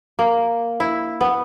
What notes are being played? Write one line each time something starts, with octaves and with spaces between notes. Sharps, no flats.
A#3
E4
B3